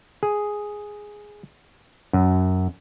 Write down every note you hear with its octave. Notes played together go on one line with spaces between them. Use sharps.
G#4
F#2